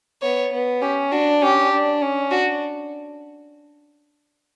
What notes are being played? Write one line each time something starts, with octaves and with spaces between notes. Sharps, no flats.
B3 C#5
B3
C#4 G4
D4 F#4
C#4 G4
D4
C#4
D4 F#4